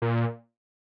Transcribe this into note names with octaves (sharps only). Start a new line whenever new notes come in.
A#2